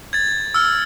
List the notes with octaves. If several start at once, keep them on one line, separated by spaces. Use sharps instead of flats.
G#6 A6
E6 F6